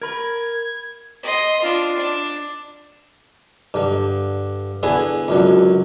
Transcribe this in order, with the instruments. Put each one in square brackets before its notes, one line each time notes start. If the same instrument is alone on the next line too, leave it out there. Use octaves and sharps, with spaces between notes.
[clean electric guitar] A#4 B5 [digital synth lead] G#6
[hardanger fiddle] D#5 C6
D4 F4
D4
[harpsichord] G2 D3
D3 B3 E4 G#4
C#2 F#2 D3